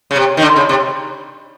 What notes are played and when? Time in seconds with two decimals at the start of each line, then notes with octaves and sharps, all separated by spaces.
0.11 C#3
0.16 C3
0.37 D#3
0.42 D3
0.56 C#3
0.69 C3